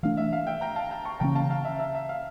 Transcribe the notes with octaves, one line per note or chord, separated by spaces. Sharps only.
E3 A3 D4 F5
E5
F5
E5 G5
G5 A#5
F5 A5
G5 A#5
A5 C#6
C#3 E3 A#3 C#4 G5 A#5
F5 A5
F5
E5
E5
E5
F5